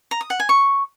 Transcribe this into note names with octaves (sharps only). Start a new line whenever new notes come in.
A#5
D#6
F#5
G#5
C#6